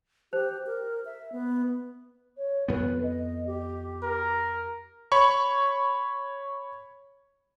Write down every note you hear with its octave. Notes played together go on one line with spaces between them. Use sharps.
G4 C5
A#4
E5
B3
C#5
F2 B3 B4
D#5
G4
A#4
C#5 B5 C#6